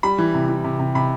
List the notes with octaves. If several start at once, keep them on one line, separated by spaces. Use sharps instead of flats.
G3 B5
E3
C3
E3
C3
C3
C3 B5